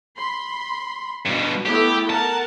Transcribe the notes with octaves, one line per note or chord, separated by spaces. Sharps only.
B5 C6
G2 B2
A3 B3 E4 G4
A#4 F#5 A5